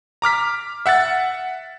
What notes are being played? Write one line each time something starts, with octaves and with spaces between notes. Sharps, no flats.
A#5 D6 F6 B6
E5 F#5 F#6 A6